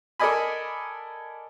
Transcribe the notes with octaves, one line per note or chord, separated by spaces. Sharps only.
A4 A#4 D5 D#5 G#5 B5